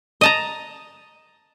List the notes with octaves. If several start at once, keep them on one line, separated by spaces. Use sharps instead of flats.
D#5 A5 A#5